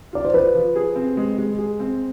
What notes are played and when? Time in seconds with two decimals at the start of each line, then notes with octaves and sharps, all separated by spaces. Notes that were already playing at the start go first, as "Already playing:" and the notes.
0.13 F4 D5
0.25 C5
0.34 F3 B4
0.55 F3
0.76 G#4
0.96 C4
1.17 G#3
1.38 G#3
1.58 G#4
1.80 C4